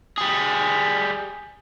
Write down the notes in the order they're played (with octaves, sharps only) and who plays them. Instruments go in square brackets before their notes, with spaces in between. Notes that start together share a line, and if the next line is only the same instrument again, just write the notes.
[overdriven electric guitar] G3 G#4